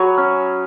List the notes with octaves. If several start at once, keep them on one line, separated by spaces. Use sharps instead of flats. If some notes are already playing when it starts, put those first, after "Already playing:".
Already playing: F#3 G#4 B4 C#5
C#4